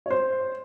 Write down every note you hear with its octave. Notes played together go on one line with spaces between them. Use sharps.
C#5
C5